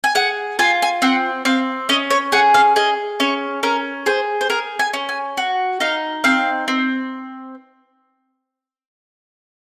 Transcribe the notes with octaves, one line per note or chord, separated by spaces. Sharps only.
G#5
G#4 F#5
F4 G#5
G#5
C4 F#5
C4 F5
C#4 D#5
C#5
G#4 F#5
F5
G#4 D#5
C#4 C#5
C#4 A#4
G#4 C5
C5
G#4 A#4
G#5
C#4
G#5
F#4
D#4 F5
C4 F5
C4